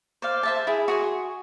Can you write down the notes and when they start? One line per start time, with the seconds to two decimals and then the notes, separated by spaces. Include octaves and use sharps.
0.22 C5 D5 F5
0.43 C5 E5 A5
0.67 E4 G#4
0.88 F#4 G#4 C6